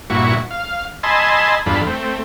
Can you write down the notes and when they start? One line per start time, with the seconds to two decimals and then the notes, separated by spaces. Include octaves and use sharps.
0.10 G2 A#2 E4 F#4 C#6
0.51 F5
1.03 D#5 G#5 A5 B5 C6 E6
1.66 E2 G2 D4 F4 A4 B5
1.87 A3 C4